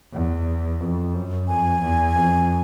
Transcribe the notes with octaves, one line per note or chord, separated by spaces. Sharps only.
E2
F2
F#2
F2 G#5
E2
F2